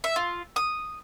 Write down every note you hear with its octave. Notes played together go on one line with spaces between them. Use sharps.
E5
F4
D#6